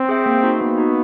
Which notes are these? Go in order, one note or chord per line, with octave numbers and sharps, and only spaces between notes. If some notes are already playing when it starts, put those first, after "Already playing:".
Already playing: C4
G#4 C5 E5 G5
A#3
D#4 F#4
A#3 B3
D#4 F#4